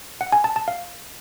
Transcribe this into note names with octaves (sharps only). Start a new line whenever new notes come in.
F#5
G#5
A5
A5
F5